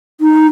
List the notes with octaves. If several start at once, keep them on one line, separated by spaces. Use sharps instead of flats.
D#4